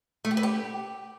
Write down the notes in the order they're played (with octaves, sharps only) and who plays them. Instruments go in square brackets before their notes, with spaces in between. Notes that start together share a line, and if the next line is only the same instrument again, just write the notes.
[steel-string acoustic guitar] A3
G4
B4
G4